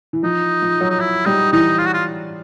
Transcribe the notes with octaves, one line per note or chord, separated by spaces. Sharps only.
E3
F3 D#4
F3
F#3
D#4
E4
G3 D#4
E3 D#4
F4
F#4
F4